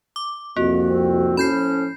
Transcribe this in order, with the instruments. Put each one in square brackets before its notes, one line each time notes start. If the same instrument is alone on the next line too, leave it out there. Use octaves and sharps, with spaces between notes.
[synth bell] D6
[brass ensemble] C2 F2 [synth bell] A#3 [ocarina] F#4
[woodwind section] C4
[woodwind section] A2 F3 C#4 [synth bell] B5 G6 C7